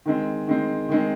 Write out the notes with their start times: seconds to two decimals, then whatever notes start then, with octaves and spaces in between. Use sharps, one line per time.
0.06 D#3 G#3 C4
0.47 D#3 G#3 C4
0.89 D#3 G#3 C4